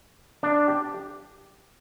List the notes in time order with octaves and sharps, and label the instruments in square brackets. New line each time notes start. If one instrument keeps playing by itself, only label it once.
[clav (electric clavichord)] D4
G4